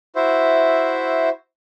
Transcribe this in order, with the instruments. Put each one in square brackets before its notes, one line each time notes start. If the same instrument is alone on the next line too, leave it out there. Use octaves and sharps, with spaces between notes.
[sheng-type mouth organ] E4 F#4 C5 E5